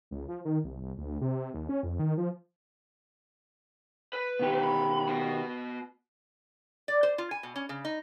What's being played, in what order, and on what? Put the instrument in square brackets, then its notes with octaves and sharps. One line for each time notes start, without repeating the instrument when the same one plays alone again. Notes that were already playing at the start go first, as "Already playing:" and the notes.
[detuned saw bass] C#2
F3
D#3
C2
C2
D2
C3
D#2
C#4
F2
D#3
F3
[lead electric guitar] B4
[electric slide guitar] B2 D#3 G4
[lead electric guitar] B5
B3 F#4
[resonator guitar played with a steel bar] D5
C5
F4
G#5
B2
C#4
C#3
D#4